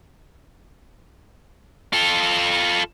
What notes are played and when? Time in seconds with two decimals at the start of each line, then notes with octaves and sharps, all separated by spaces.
1.93 F4 A4